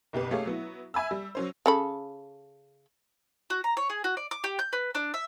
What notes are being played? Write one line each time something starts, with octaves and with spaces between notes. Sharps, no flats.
F#1 B1 G4 B4
A3 G4 G#4 C#5 F5
F#3 B3 E4
E5 G#5 B5 E6
G3
F#3 C#4 C5
C#3 A4 B5
F#4
A#5
C#5
G#4
F#4
D5
D6
G4
G6
B4
D4
E5